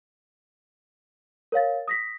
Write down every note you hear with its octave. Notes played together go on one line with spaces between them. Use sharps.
A#4 C#5 F5 A6
D#6 A#6 B6